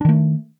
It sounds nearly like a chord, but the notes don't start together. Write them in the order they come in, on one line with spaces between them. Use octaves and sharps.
D4 D#3 A3